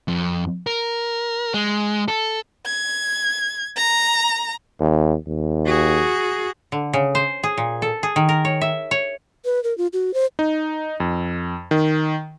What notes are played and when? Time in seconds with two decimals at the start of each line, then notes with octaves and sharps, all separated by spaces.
0.08 F2
0.67 A#4
1.54 G#3
2.08 A4
2.66 G#6
3.77 A#5
4.79 D#2
5.27 D#2
5.66 F#4 G#4
6.72 D3
6.93 C#3
7.15 C5
7.44 G#4
7.58 A#2
7.82 A4
8.03 G#4
8.16 D#3
8.29 A#4
8.45 C#5
8.61 E5
8.91 C#5
9.45 B4
9.64 A#4
9.78 F4
9.93 F#4
10.14 C5
10.39 D#4
11.00 F2
11.71 D#3